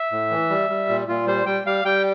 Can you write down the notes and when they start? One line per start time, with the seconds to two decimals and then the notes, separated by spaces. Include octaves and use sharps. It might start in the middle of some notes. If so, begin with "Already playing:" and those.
Already playing: E5
0.12 A2
0.31 E3
0.50 G3
0.70 G3
0.89 A#2
1.08 A#2 F4
1.27 G3 C5
1.46 G3 G5
1.65 G3 F5
1.85 G3 G5